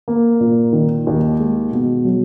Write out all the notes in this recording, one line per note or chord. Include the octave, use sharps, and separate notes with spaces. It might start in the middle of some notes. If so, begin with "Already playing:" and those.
A#3
A#2
D#3
D#2
G#3
B2
F#3